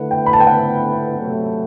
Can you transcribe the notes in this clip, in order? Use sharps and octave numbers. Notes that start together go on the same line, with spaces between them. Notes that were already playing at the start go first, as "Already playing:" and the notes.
Already playing: D3 A3 E4 B4 F#5
G5
B5
A5
G5
F#5
C3 F#3 A3